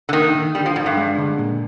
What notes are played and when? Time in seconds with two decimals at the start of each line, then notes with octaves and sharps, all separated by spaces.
0.09 D3
0.13 D#3 A#3
0.35 D#3
0.55 D3 G3
0.66 F3
0.76 G#2 D4
0.86 G2
0.97 G#3
1.18 D3
1.38 A#2